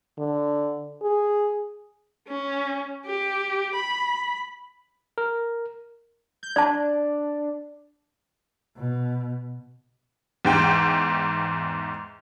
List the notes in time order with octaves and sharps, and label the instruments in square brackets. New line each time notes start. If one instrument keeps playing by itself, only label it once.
[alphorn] D3
G#4
[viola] C#4
G4
B5
[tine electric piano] A#4
[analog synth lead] G6
[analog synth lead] D4 [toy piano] D5 A5
[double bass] B2
[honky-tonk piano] E2 G#2 G5